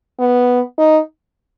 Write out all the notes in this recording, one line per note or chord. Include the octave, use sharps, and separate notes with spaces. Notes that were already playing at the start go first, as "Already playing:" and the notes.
B3
D#4